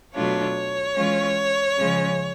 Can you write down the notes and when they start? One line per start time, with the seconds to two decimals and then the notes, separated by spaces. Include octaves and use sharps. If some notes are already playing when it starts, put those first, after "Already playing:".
0.14 B2 F#3 A3 D4 F4 C#5
0.96 E3 G#3 C#4 F4
1.78 C#3 F3 G#3 C#4